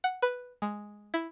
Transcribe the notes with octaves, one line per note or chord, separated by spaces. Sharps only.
F#5
B4
G#3
E4